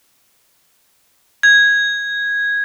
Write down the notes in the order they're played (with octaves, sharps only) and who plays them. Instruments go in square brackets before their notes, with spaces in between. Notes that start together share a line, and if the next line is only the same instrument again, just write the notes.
[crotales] G#6